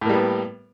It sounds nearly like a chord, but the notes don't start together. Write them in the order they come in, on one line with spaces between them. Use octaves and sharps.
A2 A#3 G3 B3